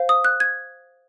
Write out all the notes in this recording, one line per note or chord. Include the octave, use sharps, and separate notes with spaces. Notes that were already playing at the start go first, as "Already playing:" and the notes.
Already playing: C5 F5
D#6
F#6
G#6